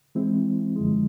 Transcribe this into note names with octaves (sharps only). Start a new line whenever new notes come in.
E3 G#3 C4 E4
F#2 D3 F3 G#3